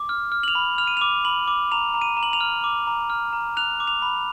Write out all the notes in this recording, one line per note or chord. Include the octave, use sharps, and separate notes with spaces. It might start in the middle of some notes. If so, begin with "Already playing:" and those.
Already playing: D6
F6
F6
F#7
F7
B5
F6 F7
D#7
D6 F7
B5 F#7
D6
A#5 F7
A#5
D#7
A#5
F#7
F7
F6
D6
A#5
F6
A#5
F#6 F7
D6
F7
B5